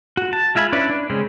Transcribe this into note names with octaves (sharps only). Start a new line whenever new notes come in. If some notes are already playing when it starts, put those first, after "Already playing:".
F#4
A5
G#3 F4 E5 G#5 B5
C#4 D4 E4 B4 D5
D4
C#3 G#3 C4 C#4